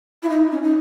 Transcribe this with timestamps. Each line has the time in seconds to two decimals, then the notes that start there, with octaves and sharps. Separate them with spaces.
0.23 E4
0.29 D#4
0.51 C#4
0.63 D#4